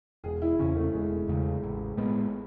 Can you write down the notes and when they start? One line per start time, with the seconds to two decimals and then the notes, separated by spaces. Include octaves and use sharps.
0.24 E1 G#4
0.42 E4
0.59 E2 C#3 C#4
0.76 A3
0.93 E1 G#3
1.28 E2 C#3
1.63 A1
1.97 A2 G#3 B3